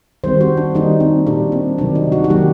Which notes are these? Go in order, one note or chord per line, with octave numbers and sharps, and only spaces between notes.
D#3 G3 C4 C5
F#4
D4
D#3 G3 A#3 D#4
C4
A#2 G3 A#3 D4
C4
C3 D#3 F#3 D4
D#4
F#4
F#4
D#3 F#3 A#3 G4